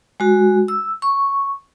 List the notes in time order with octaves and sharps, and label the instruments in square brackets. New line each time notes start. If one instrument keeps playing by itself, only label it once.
[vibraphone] G#3 F#4
E6
C#6